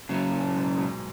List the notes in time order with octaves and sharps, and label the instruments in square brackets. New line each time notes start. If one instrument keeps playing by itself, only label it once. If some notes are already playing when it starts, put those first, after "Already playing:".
[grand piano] F#2 [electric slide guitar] C#3 F#3 C#4
[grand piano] F#2 A#2
G#2 B2
G#2 B2